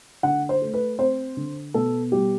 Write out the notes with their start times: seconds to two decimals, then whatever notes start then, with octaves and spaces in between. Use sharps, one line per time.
0.23 D3 F#5
0.49 C5
0.62 A3
0.74 B4
0.99 C4 C5
1.37 D3
1.74 B2 A4
2.12 G3 G4